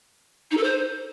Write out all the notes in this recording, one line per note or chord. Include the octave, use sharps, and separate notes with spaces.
D#4
A4
C5